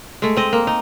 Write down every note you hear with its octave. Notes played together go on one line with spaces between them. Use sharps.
G#3 A3
C4 D#5
A#3
D#4